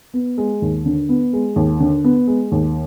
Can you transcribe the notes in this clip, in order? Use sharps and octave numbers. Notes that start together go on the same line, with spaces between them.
B3
G#3
D#2
D3
B3
G#3
D#2
D3
B3
G#3
D#2